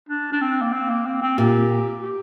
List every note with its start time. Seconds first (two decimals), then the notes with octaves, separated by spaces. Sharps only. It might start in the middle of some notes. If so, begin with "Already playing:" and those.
0.09 D4
0.32 D4
0.41 C4
0.61 A#3
0.73 C4
0.90 A#3
1.06 C4
1.21 C4
1.38 A#2 G4
2.03 G4